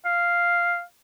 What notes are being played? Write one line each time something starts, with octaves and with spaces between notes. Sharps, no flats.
F5